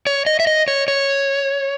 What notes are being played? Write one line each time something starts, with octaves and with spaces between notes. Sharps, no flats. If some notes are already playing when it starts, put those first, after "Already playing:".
C#5
D#5
E5
D#5
C#5
C#5